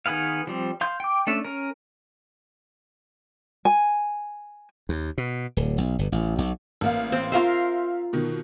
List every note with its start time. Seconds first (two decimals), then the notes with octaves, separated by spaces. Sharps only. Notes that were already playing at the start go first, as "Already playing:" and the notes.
0.06 D#3 B3 G#4 B4 F5
0.47 F3 G3 C4
0.81 F5 C6 G6
1.00 G5 D6
1.27 A3 C#4 D4 E5
1.44 C#4 A#4
3.65 G#5
4.89 D#2
5.18 B2
5.57 D1
5.78 B1
5.99 G1
6.12 A1
6.38 B1
6.81 A1 A#3 F5
7.12 C4
7.32 F4 A#4 C5 E5 F5 C6
8.13 B2 D#3